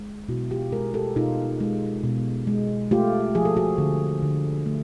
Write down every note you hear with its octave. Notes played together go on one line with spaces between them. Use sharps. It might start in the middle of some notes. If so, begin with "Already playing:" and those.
Already playing: G#3
B2 E4 F#4
F4 G4
G#3 G#4 A#4
G4 A4
B2 D#4 F4
G#3
B2
G#3
A3 F4 G4
F3 G#4
A4
F#4 G#4
D3
D3
A3